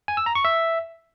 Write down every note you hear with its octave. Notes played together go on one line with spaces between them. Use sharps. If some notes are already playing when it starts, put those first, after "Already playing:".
G#5
E6
A#5
C#6
E5